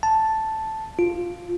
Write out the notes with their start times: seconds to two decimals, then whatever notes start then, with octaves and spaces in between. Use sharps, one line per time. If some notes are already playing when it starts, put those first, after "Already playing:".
0.03 A5
0.99 F4